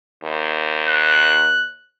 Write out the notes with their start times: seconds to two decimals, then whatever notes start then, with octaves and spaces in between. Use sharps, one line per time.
0.23 D#2
0.87 F#6